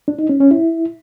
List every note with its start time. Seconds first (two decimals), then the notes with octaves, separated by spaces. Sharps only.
0.08 D4
0.19 D#4
0.29 C#4
0.40 C#4
0.51 E4